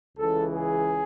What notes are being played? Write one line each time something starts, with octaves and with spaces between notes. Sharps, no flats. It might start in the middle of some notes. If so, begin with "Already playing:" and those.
C#2 C#3 E3 A4
G#4